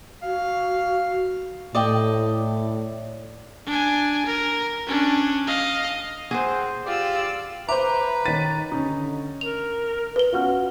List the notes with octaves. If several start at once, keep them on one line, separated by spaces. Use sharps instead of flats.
F#4 F5
A2 D5 D#5 G5
D4 G#5
A#4
C#4 D4
D#5 F5
C4 G#4 C5 F#5
F4 G4 D5 E6
B4 C5 E5 A#5 D6
D#3 C#5 A6 B6 D#7
D3 C#4 D#4
A#4 F7
B4 G7
C#4 F4 F#4 F6